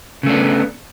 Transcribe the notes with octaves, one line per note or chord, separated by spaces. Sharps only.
C#3 A3 B3 D4